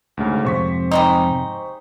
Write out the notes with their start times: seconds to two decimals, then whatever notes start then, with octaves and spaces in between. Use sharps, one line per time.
0.17 D2 G#2 C#3
0.45 F2 G#2 C3 C5 C#6 B6
0.91 G3 G#3 D#4